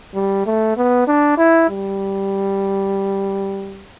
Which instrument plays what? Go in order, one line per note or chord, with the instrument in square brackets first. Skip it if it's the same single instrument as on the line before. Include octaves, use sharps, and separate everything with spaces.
[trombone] G3
A3
B3
D4
E4
G3